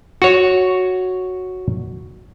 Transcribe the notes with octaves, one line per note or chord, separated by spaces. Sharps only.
F#4 C#5